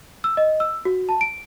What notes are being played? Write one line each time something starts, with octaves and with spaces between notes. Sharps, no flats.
E6
D#5
E6
F#4
A5
D7